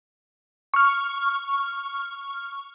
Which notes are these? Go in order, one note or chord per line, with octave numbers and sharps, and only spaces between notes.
C#6 F6